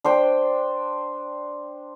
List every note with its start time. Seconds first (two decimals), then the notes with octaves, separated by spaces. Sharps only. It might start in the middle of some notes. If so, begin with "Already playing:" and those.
0.04 D4 C5 G5